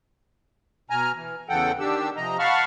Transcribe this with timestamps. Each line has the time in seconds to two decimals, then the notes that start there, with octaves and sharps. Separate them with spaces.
0.90 B2 G#5 A#5 F6
1.15 E3
1.49 E2 C#3 E3 A4 F#5 G5
1.79 D#3 D4 G4 E6
2.17 C3 F3 D#5 A#5
2.39 F5 F#5 A5 B5 C#6 F6